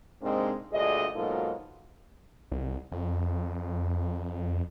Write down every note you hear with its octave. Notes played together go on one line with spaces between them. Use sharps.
G#2 C3 G#3 A#3 C4 D4
D2 G2 A#2 G#4 D#5
G#2 B2 F#3 A#3 F4 A4
C2
F2